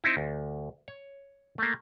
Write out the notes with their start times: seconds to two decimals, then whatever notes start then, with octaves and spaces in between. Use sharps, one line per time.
0.04 C4 D#4 E4
0.17 D2
0.88 C#5
1.58 A3 A#3